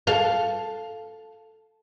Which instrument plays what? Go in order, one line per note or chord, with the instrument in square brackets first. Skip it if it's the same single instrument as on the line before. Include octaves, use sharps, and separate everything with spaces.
[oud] A4 F5